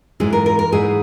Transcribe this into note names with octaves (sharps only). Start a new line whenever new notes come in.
G#2 E3 G#3 G#4
A#4
A#4
A#4
G#2 E3 G#3 G#4